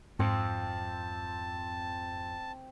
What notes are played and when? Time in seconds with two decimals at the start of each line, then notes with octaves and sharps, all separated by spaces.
0.19 F2 G#2 C4 A5